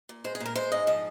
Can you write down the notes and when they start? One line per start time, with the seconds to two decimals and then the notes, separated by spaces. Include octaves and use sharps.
0.09 A#2
0.24 G#3 C5
0.35 G#4
0.40 A#2
0.45 A#4
0.56 G#3 C5
0.72 G#2 D#5
0.87 F3 D#5